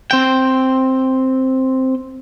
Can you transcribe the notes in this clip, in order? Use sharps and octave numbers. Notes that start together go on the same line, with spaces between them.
C4 G5